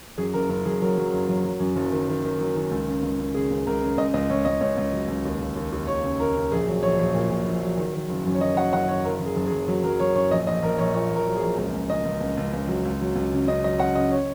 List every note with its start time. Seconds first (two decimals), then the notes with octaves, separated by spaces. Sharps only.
0.18 F#2 G#4
0.33 F#1 A#4
0.49 F#1 A#4
0.65 F#1 G#4
0.82 F#3 A#4
0.97 F#3
1.13 F#1
1.28 F#3
1.45 F#3
1.60 F#2
1.76 F#1
1.91 D#3
2.08 D#3
2.24 D#3
2.39 F#3
2.55 D#3
2.71 C#2
2.87 C#3
3.03 C#2
3.19 C#3
3.35 C#3 G#4
3.51 C#2
3.67 C#2 A#4
3.82 C#3
3.98 C#2 D#5
4.14 C#2 D#5
4.30 C#2 C#5
4.45 C#2 D#5
4.61 C#2 C#5
4.77 C#2
4.93 F#3
5.08 C#2
5.25 D#2
5.41 D#2
5.56 D#2
5.72 D#2
5.87 D#2 C#5
6.03 C#3
6.20 D#2 A#4
6.35 C#3
6.52 A#1 G#4
6.67 F#3
6.83 A#1 C#5
6.99 A#1
7.14 A#2
7.30 A#2
7.46 A#1
7.62 F#3
7.77 D#3
7.94 D#3
8.09 F#1
8.26 F#2
8.35 C#5
8.41 F#3 D#5
8.56 F#3 F#5
8.73 F#1 F#5
8.88 F#2 C#5
9.05 F#1 A#4
9.20 F#1
9.26 G#4
9.36 F#1
9.47 G#4
9.52 F#1
9.68 F#3
9.83 F#3 A#4
10.00 F#3 C#5
10.15 F#2 C#5
10.31 A#1 D#5
10.46 A#1 D#5
10.62 A#1 A#4
10.78 A#1 C#5
10.94 A#2 C#5
11.11 A#1 A#4
11.26 F#3
11.36 G#4
11.42 A#1
11.58 C#2 A#4
11.74 C#2
11.90 C#3 D#5
12.05 C#2
12.21 C#2
12.37 C#2
12.53 C#2
12.68 F#3
12.85 C#2
13.01 F#3
13.16 C#2
13.33 C#3
13.47 C#3 D#5
13.64 F#3 D#5
13.79 C#3 F#5
13.95 C#3 D#5
14.12 C#5